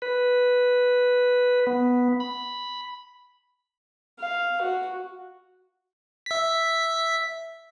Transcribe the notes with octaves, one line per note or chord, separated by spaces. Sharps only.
B4
B3
B5
F5
F#4
E5 B6